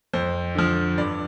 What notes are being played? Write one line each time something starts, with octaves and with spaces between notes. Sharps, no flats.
F2 C5
D3 F3
G2 D5